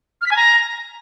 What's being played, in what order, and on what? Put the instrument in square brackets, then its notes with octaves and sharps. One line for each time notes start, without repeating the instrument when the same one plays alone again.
[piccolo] F6
B6
G#5
A#5